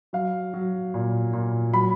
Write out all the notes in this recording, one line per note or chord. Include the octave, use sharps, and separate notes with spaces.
F#3 F5
F#3
A#2
A#2
F#3 B5